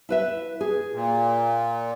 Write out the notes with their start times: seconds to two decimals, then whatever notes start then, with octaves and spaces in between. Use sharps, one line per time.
0.09 E4 B4 E5
0.61 G#4
0.93 A#2